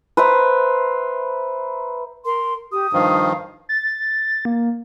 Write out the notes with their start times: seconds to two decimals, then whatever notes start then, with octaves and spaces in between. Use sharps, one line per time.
0.17 B4 C5 E5 A#5
2.25 A#4 C6
2.72 G4 D#6
2.93 G2 D#3 F3 F5
3.69 A6
4.45 A#3